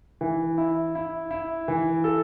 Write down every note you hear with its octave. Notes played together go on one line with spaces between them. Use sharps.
E3
E4
E4
E4
E3
A4